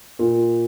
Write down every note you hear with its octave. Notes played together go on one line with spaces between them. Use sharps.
A#2